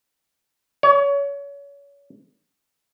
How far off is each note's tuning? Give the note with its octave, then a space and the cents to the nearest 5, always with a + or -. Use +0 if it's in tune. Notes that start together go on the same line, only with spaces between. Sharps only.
C#5 +30